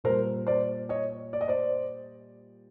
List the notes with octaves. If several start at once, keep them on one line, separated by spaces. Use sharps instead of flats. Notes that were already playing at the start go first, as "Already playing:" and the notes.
A#2 G3 A#4 C5
C5 D5
C#5 D#5
D5
D#5
C5 D5